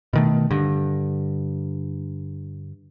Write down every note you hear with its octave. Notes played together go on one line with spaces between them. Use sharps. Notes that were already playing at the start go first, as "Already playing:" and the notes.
B2 D#3 A3
G2 D3